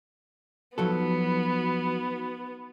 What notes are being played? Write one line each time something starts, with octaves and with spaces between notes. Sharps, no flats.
F3 F#3 B3 D#4 F#4 A4